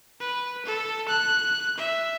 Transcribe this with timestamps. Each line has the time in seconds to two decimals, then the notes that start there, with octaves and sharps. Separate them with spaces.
0.20 B4
0.66 A4
1.08 F#6
1.78 E5